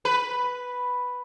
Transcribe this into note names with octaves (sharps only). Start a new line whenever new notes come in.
B4